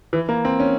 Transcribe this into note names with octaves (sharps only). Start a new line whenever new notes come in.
E3
A#3
C4
C#4